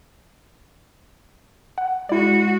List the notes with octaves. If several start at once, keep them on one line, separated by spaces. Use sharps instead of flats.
F#5
G#3 E4 F#4 D5